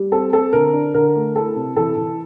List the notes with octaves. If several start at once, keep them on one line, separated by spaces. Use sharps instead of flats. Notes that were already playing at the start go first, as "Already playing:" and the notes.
Already playing: G3
C4 A4
C4 A4
D3 A#4
D4
D3 A#4
A3
E4 A4
C3
E3 A4
E3